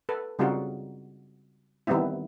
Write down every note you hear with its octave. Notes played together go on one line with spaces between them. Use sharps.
A4 B4
C#3 G3 C4 D#4 F4 F#4
D#3 E3 G3 B3 C4 E4